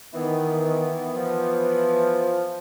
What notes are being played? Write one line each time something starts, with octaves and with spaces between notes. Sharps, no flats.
D#3 E3 B3
F3